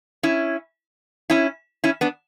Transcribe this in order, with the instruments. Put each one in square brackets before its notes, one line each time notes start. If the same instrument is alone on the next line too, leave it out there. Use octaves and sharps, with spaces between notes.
[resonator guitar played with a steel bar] C#4 E4
C#4 E4
C#4 E4
B3 D4